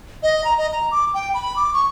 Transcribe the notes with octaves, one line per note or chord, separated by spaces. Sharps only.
D#5
A#5
D#5
A#5
D6
G5
B5
D6
C#6